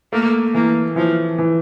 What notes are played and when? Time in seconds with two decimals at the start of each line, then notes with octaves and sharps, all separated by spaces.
0.12 A3 A#3
0.54 E3 A#3
0.96 E3 F3
1.38 E3